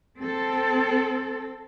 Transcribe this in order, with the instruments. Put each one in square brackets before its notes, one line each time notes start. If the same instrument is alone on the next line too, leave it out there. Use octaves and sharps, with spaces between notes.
[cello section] C4 A4